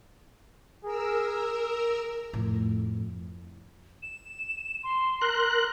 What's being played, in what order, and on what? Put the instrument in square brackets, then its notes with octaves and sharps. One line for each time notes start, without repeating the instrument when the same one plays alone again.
[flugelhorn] G#4 [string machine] A#4 E6
[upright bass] F2 A2
[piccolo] E7
C6
[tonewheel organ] A#4 F#6